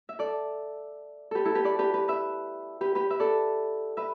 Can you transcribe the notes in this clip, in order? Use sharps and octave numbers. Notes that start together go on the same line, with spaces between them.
E5
A4 D5
G4 A4 B4
E4 A4
G4 B4
A4 D5
G4 B4
G4 B4
B4 E5
G4 B4
G4 B4
B4 E5
A4 D5
B4 E5